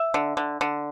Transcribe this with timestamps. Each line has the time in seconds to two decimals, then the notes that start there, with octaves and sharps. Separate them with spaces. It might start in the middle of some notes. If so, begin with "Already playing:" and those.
Already playing: E5
0.14 D3
0.37 D3
0.61 D3